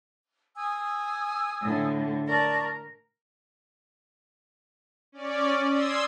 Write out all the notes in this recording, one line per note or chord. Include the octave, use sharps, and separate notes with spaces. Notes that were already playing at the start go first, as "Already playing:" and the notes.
G#5 D#6 E6
A2 D3
A#4 D5 A5 C#6
C#4 D5
C6 D#6 E6 G#6